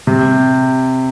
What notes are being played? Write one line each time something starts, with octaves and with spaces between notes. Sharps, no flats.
C3